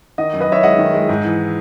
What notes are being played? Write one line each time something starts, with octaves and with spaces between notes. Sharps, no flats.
D#3 D#5 F#5
F#2
B4 D#5
F#2 C#5 E5
G#3 D#5 F#5
D#3
G#3
G#2
E3